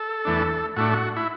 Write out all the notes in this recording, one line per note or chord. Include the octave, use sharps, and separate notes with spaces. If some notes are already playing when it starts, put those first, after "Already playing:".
Already playing: A4
E2 E3 A3 D4
A2 A3 D4 F#4
F#4
E4